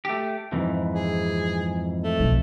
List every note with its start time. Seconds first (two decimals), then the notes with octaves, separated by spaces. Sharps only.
0.05 A3 G4
0.52 F2 G#2 E3
0.94 G#4
2.04 A3
2.20 B1